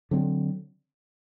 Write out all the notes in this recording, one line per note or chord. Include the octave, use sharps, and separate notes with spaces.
D3 F#3 C4